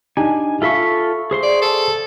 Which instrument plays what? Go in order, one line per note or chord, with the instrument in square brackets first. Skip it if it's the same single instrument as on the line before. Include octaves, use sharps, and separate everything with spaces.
[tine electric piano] D4 D#4 G4 [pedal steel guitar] G#5
[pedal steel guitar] F4 A4 B5 [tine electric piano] E5 F5 C#6
[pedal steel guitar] G#4 C5 C6
[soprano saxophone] D5
A4